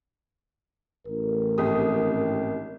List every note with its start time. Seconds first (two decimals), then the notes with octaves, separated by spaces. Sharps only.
1.07 A1 A#4
1.58 G#1 G4 D#6